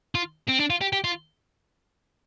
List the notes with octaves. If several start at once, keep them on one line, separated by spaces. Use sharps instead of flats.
F4
C4
D4
F4
G4
G4
F4